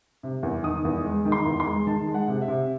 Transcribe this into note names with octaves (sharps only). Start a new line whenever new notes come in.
C3
E2
D#3 D#6
E2
G#3
D#3
C6
E2
C6
G#3
D#3 A5
G#3
F#5
C3
E5
C3